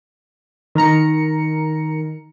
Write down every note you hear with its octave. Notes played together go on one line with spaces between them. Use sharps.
D#3 A#4 A#5 C#7